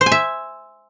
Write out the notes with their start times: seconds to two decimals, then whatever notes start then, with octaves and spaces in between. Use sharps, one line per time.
0.01 C5
0.06 G#5
0.12 E5